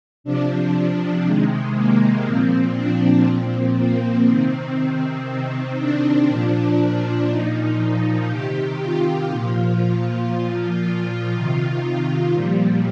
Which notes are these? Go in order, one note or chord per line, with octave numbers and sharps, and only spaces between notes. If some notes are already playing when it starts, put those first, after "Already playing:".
C3 F3 D4
C3 D#3 G#3
A#3
A#2 F3 C4
D4
A#2 F3 C4
A#3
C3 D#3 C4
C3 D#3 C4
D4
A#2 F3
A#2 F3 D#4
C3 D#3 G4
F4
A#2 F3
F4
A#2 F3
F4
C3 D#3
A#2 F3 G3